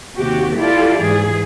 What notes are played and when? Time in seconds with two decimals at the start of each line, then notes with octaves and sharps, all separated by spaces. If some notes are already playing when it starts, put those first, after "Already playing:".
0.17 D#2 C3 F#4 G4
0.58 E4 F4 G4 A4 D5
1.03 G#2 E3 G#4